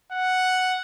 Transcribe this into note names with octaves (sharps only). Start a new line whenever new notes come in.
F#5